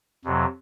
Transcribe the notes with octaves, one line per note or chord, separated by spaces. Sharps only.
F2 C3 F#3